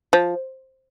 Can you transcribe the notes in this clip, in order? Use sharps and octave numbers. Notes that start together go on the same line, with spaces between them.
F3